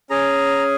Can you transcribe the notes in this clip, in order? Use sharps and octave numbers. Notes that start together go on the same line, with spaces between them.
C#4 G#4 A#5